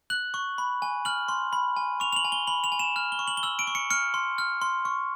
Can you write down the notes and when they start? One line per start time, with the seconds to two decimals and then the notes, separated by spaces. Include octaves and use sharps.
0.10 F#6 F#7
0.34 C#6
0.58 B5
0.82 G#5
1.05 F6 F#7
1.28 C6
1.53 B5
1.77 G#5
2.00 C#6 F7
2.13 F7
2.16 F#7
2.25 G#5
2.32 G7
2.47 B5 F#7
2.64 F7
2.72 G#5
2.79 E7
2.96 F6
3.12 G7
3.19 C#6
3.28 F#7
3.37 G7
3.43 E6 F#7
3.59 D7
3.67 C#6
3.75 C#7
3.90 F6 C#7
4.14 C6
4.38 F6
4.61 C6
4.85 C#6